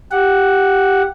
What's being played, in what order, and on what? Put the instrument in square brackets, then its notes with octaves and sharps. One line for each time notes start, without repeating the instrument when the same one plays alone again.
[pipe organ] G4 F#5